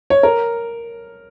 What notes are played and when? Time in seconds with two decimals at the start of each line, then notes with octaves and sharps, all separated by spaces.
0.10 C#5
0.23 A#4